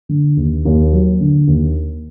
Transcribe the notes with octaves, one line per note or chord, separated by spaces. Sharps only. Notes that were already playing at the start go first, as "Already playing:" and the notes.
D3
D#2
D#2
F#3
D3
D#2